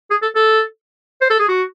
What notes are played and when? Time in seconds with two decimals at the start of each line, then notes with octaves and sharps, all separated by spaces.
0.10 G#4
0.22 A4
0.35 A4
1.21 C5
1.30 A4
1.40 G#4
1.48 F#4